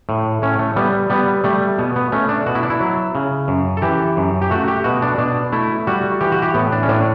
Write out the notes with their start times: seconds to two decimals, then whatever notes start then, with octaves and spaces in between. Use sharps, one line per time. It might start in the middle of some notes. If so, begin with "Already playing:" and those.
0.09 A2
0.42 A2 C#4
0.59 A3
0.76 G3 B3
1.10 G3 B3
1.44 G3 A3
1.79 B2 B3
1.96 B3
2.12 A3 C#4
2.29 D4
2.46 B2 F#4
2.55 E4
2.63 D4
2.70 E4
2.80 F#3
3.15 C#3
3.48 F#2
3.77 A4
3.82 E3 G4
4.17 F#2
4.42 G4
4.51 A3 F#4
4.68 G4
4.84 B2 F#4
5.02 D4
5.18 B2 D4
5.53 A3 E4
5.87 G3 F#4
6.21 E3 G4
6.32 F#4
6.42 G4
6.54 A2 B3
6.72 D4
6.83 C#4
6.88 A2 D4